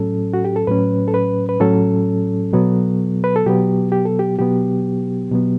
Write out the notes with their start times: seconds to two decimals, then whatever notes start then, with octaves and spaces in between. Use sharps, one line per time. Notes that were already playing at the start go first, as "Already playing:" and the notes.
Already playing: A2 F#3 C#4 A4
0.34 F#4
0.45 G4
0.56 A4
0.67 A2 F#3 C#4 B4
1.08 A4
1.14 B4
1.49 B4
1.60 A2 F#3 C#4 A4
2.53 B2 F#3 B3
3.24 B4
3.36 A4
3.46 B2 F#3 B3 G4
3.92 G4
4.05 A4
4.19 G4
4.39 B2 F#3 B3 G4
5.31 B2 F#3 B3